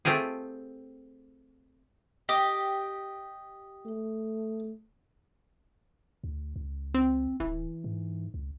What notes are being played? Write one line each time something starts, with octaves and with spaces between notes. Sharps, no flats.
A3 C4 F4 G4 G#4
G4 D#5
A3
D2
C#2
C4
D1 E3
G#2
C#2